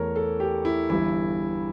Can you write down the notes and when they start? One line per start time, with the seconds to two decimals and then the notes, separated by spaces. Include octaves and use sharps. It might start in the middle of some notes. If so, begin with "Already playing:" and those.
Already playing: E2 E3 A3 A#4 C#5
0.16 A4
0.40 G4
0.65 E4
0.90 G1 G2 E3 E4